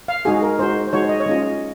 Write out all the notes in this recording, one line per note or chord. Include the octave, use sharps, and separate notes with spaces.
F5
G#3 D#4 F#4 G#4
A#4
G#3 D#4 F#4 C5
C5
G#3 D#4 F#4 C#5
D#5
C#5
G#3 C#4 F4 D#5